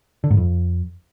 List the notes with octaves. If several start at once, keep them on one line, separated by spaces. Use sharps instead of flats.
D3
G#2
F2